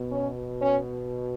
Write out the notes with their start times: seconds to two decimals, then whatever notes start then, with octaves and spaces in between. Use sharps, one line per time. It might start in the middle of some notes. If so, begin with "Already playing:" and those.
Already playing: B2
0.11 C#4
0.60 C#4